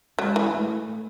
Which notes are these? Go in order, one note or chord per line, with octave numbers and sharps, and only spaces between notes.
F#3 G#3
E3
A3